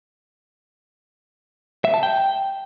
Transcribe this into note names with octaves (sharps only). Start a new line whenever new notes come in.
E5
A5
G5